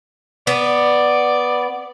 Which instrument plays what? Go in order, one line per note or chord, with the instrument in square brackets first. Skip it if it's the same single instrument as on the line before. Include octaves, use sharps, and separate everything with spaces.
[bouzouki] B3 [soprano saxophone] D5